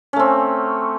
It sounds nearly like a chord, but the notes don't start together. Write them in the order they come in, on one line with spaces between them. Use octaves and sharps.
C#4 A3 C4